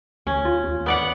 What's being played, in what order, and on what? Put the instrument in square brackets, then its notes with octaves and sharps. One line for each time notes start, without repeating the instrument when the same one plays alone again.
[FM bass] D2 [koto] C#4
[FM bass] F4
D#2
[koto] B3 D5 F#5